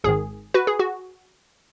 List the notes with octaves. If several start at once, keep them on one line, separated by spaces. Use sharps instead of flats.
G#1 G#2 D#3 G#4
F#4 B4
G#4
F#4